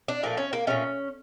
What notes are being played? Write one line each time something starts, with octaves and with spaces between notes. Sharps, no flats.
D4
A#2 F3 A3 A#3
C#4
A#3
A#2 F3 A3 C#4